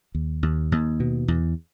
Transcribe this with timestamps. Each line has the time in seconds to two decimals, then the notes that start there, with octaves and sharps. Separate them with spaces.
0.15 D#2
0.43 D#2
0.72 D#2
1.00 B2
1.28 E2